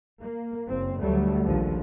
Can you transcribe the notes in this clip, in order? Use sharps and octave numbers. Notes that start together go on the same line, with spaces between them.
A#3
F#1 C4
D2 D3 F#3 G3 A3
A#1 D#2 D3 F3